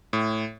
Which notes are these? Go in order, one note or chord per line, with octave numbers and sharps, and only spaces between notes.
A2